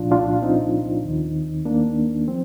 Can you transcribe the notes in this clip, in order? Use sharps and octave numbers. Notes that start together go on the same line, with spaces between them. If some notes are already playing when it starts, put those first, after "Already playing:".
Already playing: C2 A#2 F3 D4 F4
D4 F4
C4 D#4
D#2 D#3
A#3 D4
F3 C4